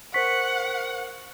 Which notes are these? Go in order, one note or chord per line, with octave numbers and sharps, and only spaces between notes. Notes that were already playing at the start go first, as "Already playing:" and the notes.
A#4 C5 F#5 C#6 B6